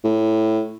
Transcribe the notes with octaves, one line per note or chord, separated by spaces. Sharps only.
A2